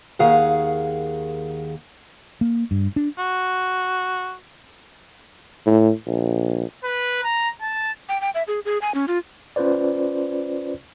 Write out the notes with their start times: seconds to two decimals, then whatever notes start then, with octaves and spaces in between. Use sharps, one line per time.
0.19 D#2 D#3 G#4 F5 F#5
2.41 A#3
2.71 G2
2.96 D4
3.18 F#4
5.66 A2
6.07 A#1
6.84 B4
7.23 A#5
7.61 A5
8.09 G5
8.21 G5
8.35 E5
8.48 G#4
8.65 G#4
8.82 G#5
8.95 C#4
9.08 F4
9.56 C#4 F4 B4 C5 D5